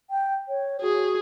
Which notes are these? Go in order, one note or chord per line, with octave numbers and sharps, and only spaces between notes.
G5
C#5
F#4 G#4